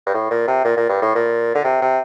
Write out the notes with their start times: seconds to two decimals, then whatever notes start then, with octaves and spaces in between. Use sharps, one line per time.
0.07 G2
0.14 A2
0.31 A#2
0.47 C3
0.65 A#2
0.77 A#2
0.89 G2
1.02 A2
1.15 A#2
1.55 D3
1.64 C3
1.82 C3